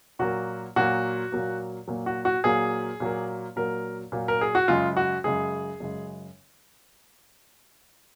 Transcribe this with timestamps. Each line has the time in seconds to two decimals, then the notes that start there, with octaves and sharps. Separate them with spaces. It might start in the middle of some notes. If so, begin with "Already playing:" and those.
0.19 A#2 F#3 A#3 F#4
0.76 A#2 F#3 A#3 F#4
1.32 A#2 F#3 A#3
1.88 A#2 F#3 A#3
2.06 F#4
2.25 F#4
2.44 A#2 F#3 A#3 G#4
3.00 A#2 F#3 A#3
3.56 A#2 F#3 A#3 A#4
4.12 A#2 F#3 A#3
4.28 A#4
4.41 G#4
4.55 F#4
4.68 F#2 C#3 G#3 F4
4.97 F#4
5.24 F#2 C#3 G#3 G#4
5.80 F#2 C#3 G#3